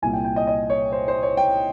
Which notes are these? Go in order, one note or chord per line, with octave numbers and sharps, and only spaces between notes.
C2 A#2 G#5
G5
G5
D#5
D#5
C#5
C5
C5
C#5
G5